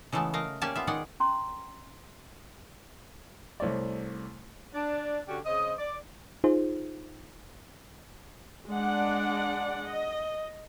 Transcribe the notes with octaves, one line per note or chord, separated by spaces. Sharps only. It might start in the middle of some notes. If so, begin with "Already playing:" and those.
C#3 E3 G#3 A3 B3 A5
A3 A#4 D#5 F5
A#3 C#4 G4 D5 G#5 A5
B3 F4 E5
D#3 G#3 G#4 D5 D#5 F#5
C#4 A#5 C6
C2 A3 C#5 D5
D4
D3 C#4 D4 F#4 G4
C#3 C4 D#5
D5
D#4 F4 G#4 C5
G#3 D4 D5 F#5
D#5